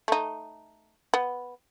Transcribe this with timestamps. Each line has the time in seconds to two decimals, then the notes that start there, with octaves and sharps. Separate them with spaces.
0.08 A3 D#4
1.14 B3